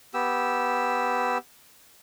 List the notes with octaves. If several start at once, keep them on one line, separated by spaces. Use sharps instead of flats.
B3 G4 E6